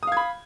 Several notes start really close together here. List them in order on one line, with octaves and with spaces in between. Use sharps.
D#6 F5 G#6 B5